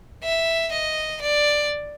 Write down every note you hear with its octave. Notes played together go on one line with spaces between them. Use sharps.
E5
D#5
D5